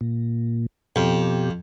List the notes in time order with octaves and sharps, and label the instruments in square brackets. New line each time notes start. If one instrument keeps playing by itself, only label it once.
[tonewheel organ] A#2
[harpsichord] F2 [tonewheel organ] B2 G4